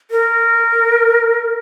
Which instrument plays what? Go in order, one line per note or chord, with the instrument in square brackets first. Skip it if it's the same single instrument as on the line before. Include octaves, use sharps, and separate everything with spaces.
[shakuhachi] A#4